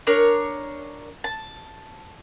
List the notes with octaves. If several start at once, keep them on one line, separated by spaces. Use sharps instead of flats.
D4 A#4 C#5
A5